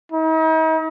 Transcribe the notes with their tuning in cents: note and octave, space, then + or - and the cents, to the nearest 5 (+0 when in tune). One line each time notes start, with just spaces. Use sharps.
D#4 +45